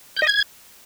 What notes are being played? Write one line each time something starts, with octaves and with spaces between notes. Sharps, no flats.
G6
D#5
G#6